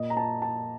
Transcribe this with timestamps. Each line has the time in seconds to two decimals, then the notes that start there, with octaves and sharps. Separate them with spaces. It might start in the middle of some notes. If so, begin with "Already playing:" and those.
Already playing: A#2 D#5
0.10 A#5
0.17 A5
0.42 A5